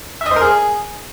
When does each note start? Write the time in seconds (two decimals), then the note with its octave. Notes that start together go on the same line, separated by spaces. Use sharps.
0.21 E5
0.26 D#5
0.31 C5
0.36 A#4
0.41 G#4